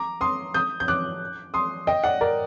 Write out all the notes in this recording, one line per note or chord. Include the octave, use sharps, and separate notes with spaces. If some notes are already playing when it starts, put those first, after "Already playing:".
Already playing: A#5 D6
C6 D#6
D#6 G6
G6
D6 F#6
C6 D#6
D#5 G5
D5 F#5
A#4 D5